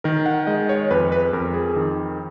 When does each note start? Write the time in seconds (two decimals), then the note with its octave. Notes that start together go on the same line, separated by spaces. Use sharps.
0.04 D#3 A#4
0.26 F#5
0.47 G#3 D#5
0.69 C#5
0.91 F2 B4
1.12 B4
1.33 F2 A#4
1.54 G#4
1.76 D#3